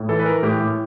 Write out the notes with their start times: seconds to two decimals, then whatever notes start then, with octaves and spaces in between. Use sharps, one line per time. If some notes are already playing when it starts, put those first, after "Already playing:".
Already playing: A2
0.09 E3 A4
0.20 B4
0.26 E3 A#4
0.43 A2 G4
0.60 A2